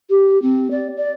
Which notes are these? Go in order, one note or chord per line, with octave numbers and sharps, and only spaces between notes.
G4
C4
D5
D5